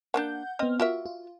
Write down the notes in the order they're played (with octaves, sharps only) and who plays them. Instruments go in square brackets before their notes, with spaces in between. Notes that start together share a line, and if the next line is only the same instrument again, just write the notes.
[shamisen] A#3 B3 D4 [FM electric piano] F#5 G6
[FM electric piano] B3 F6 [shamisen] C4 D#5
[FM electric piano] F4 [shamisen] F#4 A#4 E5
[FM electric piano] F4